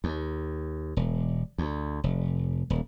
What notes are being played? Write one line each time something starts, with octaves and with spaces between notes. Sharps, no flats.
D#2
E1
D2
F1
D#1